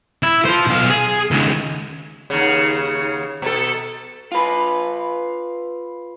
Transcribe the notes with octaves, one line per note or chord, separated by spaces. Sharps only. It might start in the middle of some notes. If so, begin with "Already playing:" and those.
E4
F4 C5
B1 F5
G#4
C#2 D#3
D#2 C#3
B2 A4
F4 B4